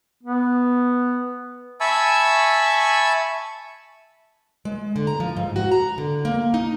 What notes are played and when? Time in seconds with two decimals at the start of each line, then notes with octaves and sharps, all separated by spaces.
0.23 B3
1.81 E5 G#5 A5 B5 C#6 E6
4.65 G#3
4.96 D3
5.07 A#5
5.20 F3
5.37 G#2
5.56 F#4
5.72 A#5
5.98 D3
6.25 A#3
6.54 D#4